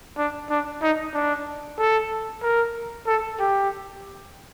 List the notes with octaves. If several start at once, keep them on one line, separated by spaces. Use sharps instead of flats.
D4
D4
D#4
D4
A4
A#4
A4
G4